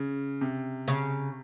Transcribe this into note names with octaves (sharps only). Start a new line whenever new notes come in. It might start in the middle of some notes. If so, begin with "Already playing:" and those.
Already playing: C#3
C3
C#3